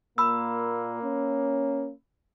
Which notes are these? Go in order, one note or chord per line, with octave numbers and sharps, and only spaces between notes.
A#2 A#3 B5 E6
C#4